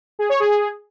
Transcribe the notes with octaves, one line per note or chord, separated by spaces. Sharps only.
G#4
C#5
G#4